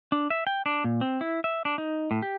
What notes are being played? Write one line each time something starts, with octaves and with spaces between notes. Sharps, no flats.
D4
E5
G5
D4
A#2
C4
E4
E5
D4
D#4
A2
G4